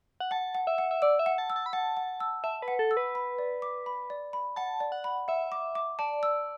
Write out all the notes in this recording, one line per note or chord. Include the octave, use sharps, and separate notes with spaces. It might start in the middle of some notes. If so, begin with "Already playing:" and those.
F#5
F#5 A5
F#5
E5
F#5
E5
D5 E6
E5
F#5
A5
E6
A5
B5
F#5 A5
F#5
E6
E5 A5
B4
F#5
A4
E6
B4
B5
D5
D6
B5
D5
B5
F#5 A5
D5
F#5
B5
E5 F#5
D6
D6
D5 A5
E6